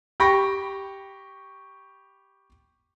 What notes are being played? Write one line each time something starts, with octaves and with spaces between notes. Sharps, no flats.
G4 G5 B5 C#6 A#6